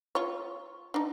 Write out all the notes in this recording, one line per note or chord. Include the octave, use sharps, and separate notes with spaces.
F4 C#5
D4 D#4